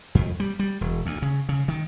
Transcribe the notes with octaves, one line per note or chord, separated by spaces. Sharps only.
F2
G3
G3
E1
D2
C#3
C#3
D#3